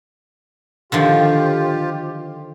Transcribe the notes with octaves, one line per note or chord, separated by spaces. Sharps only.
D3 D#3 F3 F4 G4